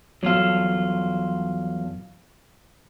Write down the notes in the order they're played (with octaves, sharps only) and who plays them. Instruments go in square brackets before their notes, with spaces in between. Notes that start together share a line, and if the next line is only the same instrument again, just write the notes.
[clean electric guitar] E2 F4 A4 [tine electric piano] F#3 F5